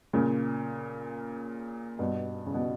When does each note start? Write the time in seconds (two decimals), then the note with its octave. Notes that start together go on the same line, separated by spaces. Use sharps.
0.13 A#2 C#3
1.99 G2 B2
2.46 C#3
2.54 B2